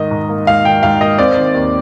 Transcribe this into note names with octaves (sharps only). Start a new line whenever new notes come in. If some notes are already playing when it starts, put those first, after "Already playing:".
Already playing: G#2 D#3 D#5
G#2
A#3
G#2 F5
D#3 G5
G#2 F5
A#3 D#5
C4 D5
D#3
D#2